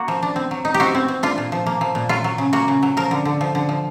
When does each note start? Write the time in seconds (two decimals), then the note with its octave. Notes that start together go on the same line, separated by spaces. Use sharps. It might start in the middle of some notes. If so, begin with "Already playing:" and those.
Already playing: A#3 F#4
0.08 F3
0.23 D4
0.36 C4
0.51 F#3
0.65 D#4
0.74 G4
0.80 C4 F#4
0.95 C4
1.08 C4
1.23 D4 F4
1.38 A#2
1.52 F3
1.66 A#3
1.81 F3
1.95 A#2
2.09 F#3 F4
2.24 F#3
2.38 C#3
2.53 A#3 F#4
2.68 C#3
2.83 F#3
2.97 F3 A#4
3.11 D3
3.25 D3
3.41 F3
3.55 D3
3.69 F3